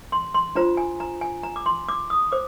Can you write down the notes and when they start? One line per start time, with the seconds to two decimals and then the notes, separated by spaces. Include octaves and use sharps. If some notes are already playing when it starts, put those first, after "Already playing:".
0.12 C6
0.34 C6
0.55 D4 F4 C5 A#5
0.77 G#5
1.00 A#5
1.21 G#5
1.43 A#5
1.56 D6
1.66 C6
1.88 D6
2.10 D#6
2.32 C5 D6